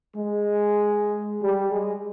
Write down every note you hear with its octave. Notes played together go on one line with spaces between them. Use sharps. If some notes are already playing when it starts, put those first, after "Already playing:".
G#3
G3
G#3